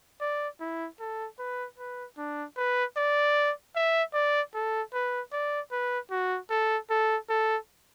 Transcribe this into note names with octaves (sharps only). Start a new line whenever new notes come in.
D5
E4
A4
B4
B4
D4
B4
D5
E5
D5
A4
B4
D5
B4
F#4
A4
A4
A4